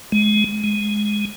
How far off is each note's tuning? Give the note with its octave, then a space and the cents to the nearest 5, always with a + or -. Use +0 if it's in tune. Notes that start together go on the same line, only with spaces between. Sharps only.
G#3 +25
G#3 +5